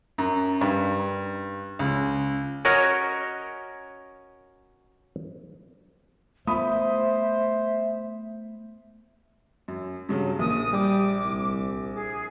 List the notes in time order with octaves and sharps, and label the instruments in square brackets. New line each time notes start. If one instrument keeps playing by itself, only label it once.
[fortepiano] F#2
G2
C#2
[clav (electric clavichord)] C#4 F#4 A#4 C#5 D#5
[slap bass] A3 B3 [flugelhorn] C5 [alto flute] E5 [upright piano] B5 D#6
[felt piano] F#2
G2 C#3 F#3
[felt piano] A#1 [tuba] A#3 [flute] D#6
[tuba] G3 [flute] D6
[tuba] C2
[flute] G#4